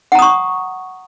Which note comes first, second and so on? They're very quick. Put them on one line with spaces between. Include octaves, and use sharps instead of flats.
F#5 A#5 D#6 C#6